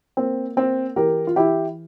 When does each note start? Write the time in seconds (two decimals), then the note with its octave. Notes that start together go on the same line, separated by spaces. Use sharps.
0.17 A#3 C4
0.56 A#3 C4
0.96 E3 G4 A#4
1.27 F4
1.36 E3 E4 G4